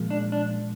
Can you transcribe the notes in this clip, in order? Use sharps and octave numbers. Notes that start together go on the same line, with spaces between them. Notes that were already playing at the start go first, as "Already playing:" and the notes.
Already playing: A#2 F3 G#3
D4
D4